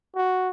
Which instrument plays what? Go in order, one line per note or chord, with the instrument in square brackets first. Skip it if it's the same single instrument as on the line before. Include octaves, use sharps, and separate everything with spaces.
[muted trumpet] F#4